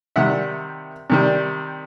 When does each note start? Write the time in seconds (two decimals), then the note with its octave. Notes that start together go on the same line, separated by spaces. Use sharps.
0.16 C3 D#3 G3 E5 F#5
1.10 C3 D#3 G3